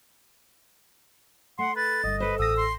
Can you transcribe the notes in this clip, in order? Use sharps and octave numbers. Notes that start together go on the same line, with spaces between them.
A3 F#5 C6
B4 A6
G1 G2 D#5
A4 B4 C5
A1 D#6 E6 A#6
C6